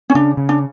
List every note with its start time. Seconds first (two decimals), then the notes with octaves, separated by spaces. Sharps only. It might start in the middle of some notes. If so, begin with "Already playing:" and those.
0.10 C#4
0.15 C#3 D4
0.37 C#3
0.49 D4